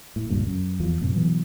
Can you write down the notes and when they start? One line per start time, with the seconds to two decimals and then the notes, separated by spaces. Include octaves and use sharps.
0.16 A2
0.30 G1 C#2 G2 A#2
0.47 F#2
0.80 E2 F3
1.01 F#2 A2 C3
1.15 B2 E3 F#3